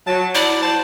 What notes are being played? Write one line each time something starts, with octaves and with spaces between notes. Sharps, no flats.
F#3 A5
E4 D5
F#4 C5 A5